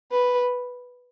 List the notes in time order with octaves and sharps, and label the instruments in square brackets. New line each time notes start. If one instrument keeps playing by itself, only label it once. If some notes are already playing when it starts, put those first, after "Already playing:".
[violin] B4